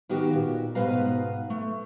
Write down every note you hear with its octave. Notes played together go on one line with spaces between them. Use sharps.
D#3 B3 F#4 G4
A#2
G#2 B2 B3 B4 F5 A#5
A3